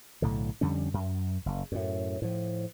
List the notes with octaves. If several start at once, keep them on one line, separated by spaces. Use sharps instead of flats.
B1 A2 D3
F2 D3 G3 C#4
F#2
F#1
F#2 A2
A2 F3